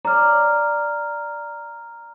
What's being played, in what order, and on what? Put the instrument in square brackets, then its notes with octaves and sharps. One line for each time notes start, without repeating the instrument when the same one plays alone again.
[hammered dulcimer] D5 [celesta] A#5 F6